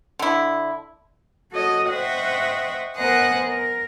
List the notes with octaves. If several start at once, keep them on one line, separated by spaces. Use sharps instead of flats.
D3 E4
F#4 A4 C#5 D#5
C5 D#5 E5 F#5 G5 C#6
B3 A#4 C5 D#5 F#5 G#5
A#4